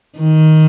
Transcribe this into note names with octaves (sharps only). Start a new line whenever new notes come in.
D#3